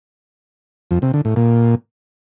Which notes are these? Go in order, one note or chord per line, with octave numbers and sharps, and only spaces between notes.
F2
C3
D3
A2
A#2